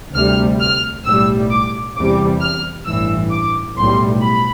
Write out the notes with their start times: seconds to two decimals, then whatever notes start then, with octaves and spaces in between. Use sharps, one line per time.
0.14 D2 C3 G3 F6
0.60 F6
1.05 B1 A2 G3 E6
1.51 D6
1.95 E2 C3 E3 G3 D6
2.41 F6
2.86 A1 G2 E3 E6
3.31 D6
3.77 B1 A2 G3 C6
4.22 B5